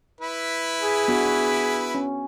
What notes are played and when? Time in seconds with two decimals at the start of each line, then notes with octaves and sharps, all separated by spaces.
0.21 E4 B4
0.81 G#4
1.08 B3 D4 F#4
1.95 C#4